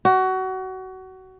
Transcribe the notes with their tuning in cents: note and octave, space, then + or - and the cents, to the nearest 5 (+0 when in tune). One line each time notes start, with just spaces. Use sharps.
F#4 +25